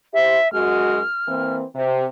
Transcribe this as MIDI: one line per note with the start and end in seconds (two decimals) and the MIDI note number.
0.14 0.39 64
0.14 0.39 67
0.14 0.39 72
0.14 0.51 76
0.53 1.01 42
0.53 1.01 56
0.53 1.01 66
0.53 1.55 89
1.27 1.64 52
1.27 1.64 58
1.27 1.64 60
1.75 2.05 48